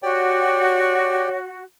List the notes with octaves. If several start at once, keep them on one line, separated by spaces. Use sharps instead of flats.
F#4 G4 C#5 D5 G5